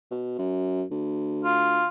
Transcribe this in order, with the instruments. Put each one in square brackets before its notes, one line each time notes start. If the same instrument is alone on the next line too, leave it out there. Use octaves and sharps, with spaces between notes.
[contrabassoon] B2
F#2
D2
[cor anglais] F4